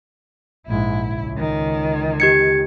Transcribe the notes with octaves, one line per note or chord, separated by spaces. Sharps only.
A#1 G#2 E4
C#2
D#3
G4 G#6 C#7